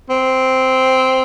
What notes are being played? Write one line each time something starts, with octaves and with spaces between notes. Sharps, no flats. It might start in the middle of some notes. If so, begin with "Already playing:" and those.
C4